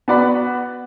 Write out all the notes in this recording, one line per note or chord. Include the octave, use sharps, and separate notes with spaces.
B3 F#4 D5 F#5 B5